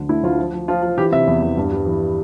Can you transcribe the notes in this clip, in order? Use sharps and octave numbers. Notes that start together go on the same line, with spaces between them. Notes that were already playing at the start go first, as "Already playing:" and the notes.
Already playing: D2 D3
A3 E4
D2 F4
F3
F3
F3 F4
F3
E3 G4
C3 E5
E2
E2
G2
G3
E3